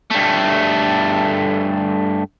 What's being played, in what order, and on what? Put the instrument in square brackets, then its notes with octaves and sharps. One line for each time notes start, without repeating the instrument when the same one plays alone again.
[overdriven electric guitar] G2 A3